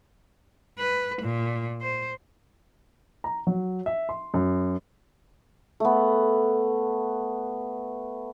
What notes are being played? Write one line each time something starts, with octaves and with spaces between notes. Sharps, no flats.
B4
A#2
C5
A#5
F#3
E5
C6
F#2
A3 B3